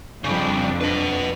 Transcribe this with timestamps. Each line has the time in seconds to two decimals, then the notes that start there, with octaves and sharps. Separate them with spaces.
0.24 F2 C#3 G3 D4
0.81 B4 D#5